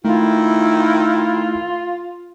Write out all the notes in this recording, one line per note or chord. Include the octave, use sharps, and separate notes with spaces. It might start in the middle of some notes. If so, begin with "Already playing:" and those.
D#3 A3 E4 F4